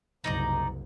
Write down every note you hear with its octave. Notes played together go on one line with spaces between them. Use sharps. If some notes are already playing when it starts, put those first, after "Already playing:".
F#1 C2 D#4 D5 A#5